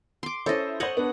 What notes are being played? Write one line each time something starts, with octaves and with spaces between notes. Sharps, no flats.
C6 D6
C#4 E4 A4 C5 D#5
C5 C#5 D#5 F#5 F#7
B3 D4